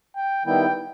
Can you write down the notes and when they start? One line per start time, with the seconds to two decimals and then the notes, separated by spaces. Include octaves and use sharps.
0.16 G5
0.45 D#3 G3 B3 E4 G5